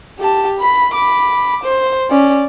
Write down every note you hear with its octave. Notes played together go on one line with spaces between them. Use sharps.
G4 A5
B5
B5 D6
C5
C#4 D5